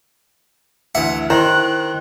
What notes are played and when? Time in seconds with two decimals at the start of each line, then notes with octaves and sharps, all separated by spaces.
0.95 D2 E3 E5 F#5
1.30 D#3 E4 C5 F#6